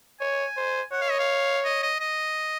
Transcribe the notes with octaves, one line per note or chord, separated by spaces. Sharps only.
C#5 G#5
C5
C#5 F#5
F5
D#5
F5
D#5
D#5
D#5